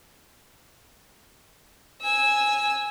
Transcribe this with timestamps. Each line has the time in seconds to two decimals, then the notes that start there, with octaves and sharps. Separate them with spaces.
2.02 G#5 E6